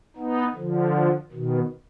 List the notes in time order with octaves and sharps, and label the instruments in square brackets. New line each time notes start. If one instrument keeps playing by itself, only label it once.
[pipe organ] B3 D#4
D3 F3
B2 D#3